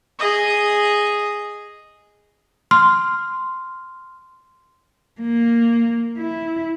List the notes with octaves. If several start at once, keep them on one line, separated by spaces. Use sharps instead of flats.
G#4 D#5
C6 F6
A#3
E4